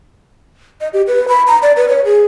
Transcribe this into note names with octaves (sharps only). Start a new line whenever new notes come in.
D#5
G4
B4
B5
A#5
D5
B4
C#5
G#4